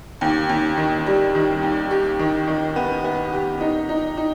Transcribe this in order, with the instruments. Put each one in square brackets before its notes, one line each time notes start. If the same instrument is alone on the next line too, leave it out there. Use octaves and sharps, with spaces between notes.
[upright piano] D#2
D#2
D#3
G3
D#3
D#2
G4
D#3
D#3
B3
B3
G4
D#4
D#4
D#4